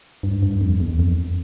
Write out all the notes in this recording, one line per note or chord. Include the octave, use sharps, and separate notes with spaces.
G2
G2
F2
E2
F2